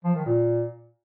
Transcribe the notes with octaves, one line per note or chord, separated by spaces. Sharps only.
F3
D#3
A#2